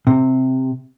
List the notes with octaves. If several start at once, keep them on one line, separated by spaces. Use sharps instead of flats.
C3